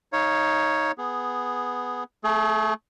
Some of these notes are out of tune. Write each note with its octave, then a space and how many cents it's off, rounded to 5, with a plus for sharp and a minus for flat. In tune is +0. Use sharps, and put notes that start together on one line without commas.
D#4 +10 C#5 +0 F5 -20
B3 +0 G#4 +0
A3 +0 G#4 +40